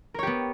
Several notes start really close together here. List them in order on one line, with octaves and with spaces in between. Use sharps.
A#4 C#5 G4 B3